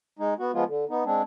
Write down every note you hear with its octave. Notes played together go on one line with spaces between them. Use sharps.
G#3 D#4
B3 F#4
F3 G#3 B3 F4
D3
B3 D#4
G#3 C4 D4